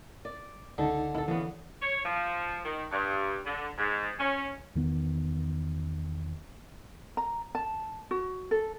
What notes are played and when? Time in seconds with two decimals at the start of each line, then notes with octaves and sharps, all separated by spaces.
0.25 D5
0.78 C#2 D3 D#4 A4 A5
1.14 E4 A4
1.28 C#3 E3 B3
1.81 C#5
2.05 F3
2.64 D#3
2.91 G2
3.45 D3
3.78 G#2
4.19 C#4
4.75 E2 D#3 B3
7.17 A#5
7.55 A5
8.11 F#4
8.51 A4